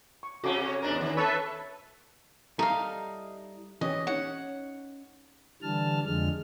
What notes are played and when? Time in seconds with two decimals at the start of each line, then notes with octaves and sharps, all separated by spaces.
0.23 C#6
0.44 C3 C#4 F#4 A4 D6
0.64 C#5
0.82 E2 G#2 D4 A#4
1.01 D#3
1.17 A4 B4 C#5 E5 B5
2.59 G3 D#4 E4 A4 F5
3.81 E3 C#4 G4 D#5
4.07 C#4 D#4 C#5 F#5
5.62 D3 E3 G3 A5 F6
6.06 F2 D3 G#3 F6